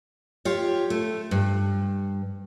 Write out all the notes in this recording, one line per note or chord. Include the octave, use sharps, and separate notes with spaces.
F4 G4 C#5
A3
G2